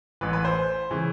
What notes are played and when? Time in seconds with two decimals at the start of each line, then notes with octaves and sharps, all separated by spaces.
0.21 A1 A2 E3 B4
0.33 B4
0.45 C5
0.91 C#3 E3